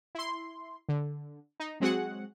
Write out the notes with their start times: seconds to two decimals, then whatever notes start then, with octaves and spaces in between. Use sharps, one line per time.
0.15 E4 C6
0.89 D3
1.60 D#4
1.80 F#3 G#3 C4 F#4 G#4 F#5